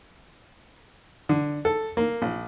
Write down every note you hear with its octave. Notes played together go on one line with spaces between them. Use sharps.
D3
A4
A#3
A#1